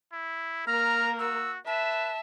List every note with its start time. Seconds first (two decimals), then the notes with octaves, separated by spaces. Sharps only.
0.13 E4
0.67 A#3 A#4 A#5 F6
1.19 F#4 E6
1.67 B4 E5 A5